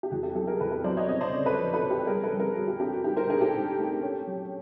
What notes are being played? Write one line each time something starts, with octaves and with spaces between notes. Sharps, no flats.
G4
E2 F#4 G#4
G4 A4
F#3 G4 A4
G#4 A#4
E2 A4 B4
A4 B4
F#3 C5 D5
C#5 D#5
C#4 C#5 D#5
C5 D5
C#3
A4 B4
F3
A4 B4
C#4
G4 A4
G3 G#4 A#4
A4 B4
G3
G#4 A#4
G3 F#4 G#4
G4
D4 G4
F#4
G#2 G4
A#4 C5
D4 G#4 A#4
G4 A4
G#2
A3
C#4
F#3